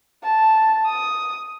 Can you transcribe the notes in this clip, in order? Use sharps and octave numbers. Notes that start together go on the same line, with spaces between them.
A5
D#6